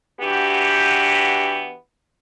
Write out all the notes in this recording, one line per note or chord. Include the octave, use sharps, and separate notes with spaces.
E3 B3 D4 F#4 G4